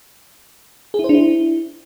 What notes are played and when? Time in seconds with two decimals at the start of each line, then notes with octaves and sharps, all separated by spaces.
0.94 G#4
0.99 E4
1.04 C5
1.09 D4
1.14 E4